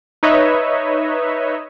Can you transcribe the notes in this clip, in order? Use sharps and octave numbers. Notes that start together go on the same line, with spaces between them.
D#4 B4 C#5 D#5 E5